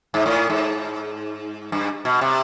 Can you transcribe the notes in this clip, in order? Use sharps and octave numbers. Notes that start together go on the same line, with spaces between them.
G#2
A2
G#2
G2
B2
C3